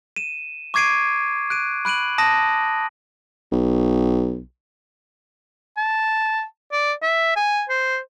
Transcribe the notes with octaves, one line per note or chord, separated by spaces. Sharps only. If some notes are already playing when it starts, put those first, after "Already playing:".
D#7 E7
C#6 D6 G#6 C7 D7 D#7
F#6 D7 D#7
B5 F#6 D7 D#7 F#7
A5 D#6 A#6 D#7
B1
A5
D5
E5
G#5
C5